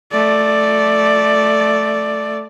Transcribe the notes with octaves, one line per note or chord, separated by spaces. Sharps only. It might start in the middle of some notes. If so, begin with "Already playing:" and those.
A3 D5